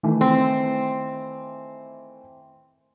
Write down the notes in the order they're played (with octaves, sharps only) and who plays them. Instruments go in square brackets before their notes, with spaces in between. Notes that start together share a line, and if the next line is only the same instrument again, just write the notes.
[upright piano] D#3 E3 A3
[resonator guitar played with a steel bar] C4